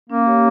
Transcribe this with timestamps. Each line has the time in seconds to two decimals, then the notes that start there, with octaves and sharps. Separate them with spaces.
0.10 A#3 C#4
0.26 G4 C#5